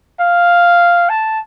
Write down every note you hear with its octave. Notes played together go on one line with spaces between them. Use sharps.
F5
A5